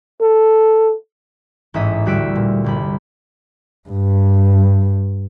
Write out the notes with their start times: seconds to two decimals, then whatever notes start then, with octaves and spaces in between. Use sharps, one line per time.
0.21 A4
1.74 A1 G#2 C#4 E5 D#6 B6
2.06 D2 G3 F#4 E6 B6 D7
2.35 A#2
2.64 G1 C2 B5
3.89 G2